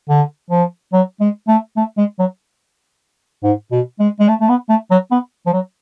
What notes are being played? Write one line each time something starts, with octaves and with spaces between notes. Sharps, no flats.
D3
F3
F#3
G#3
A3
A3
G#3
F#3
G#2
B2
G#3
G#3
A3
A3
B3
A3
F#3
B3
F3
F#3